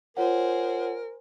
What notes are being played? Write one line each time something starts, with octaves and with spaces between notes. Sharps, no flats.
F4 G#4 A#4 C5 C#5 F#5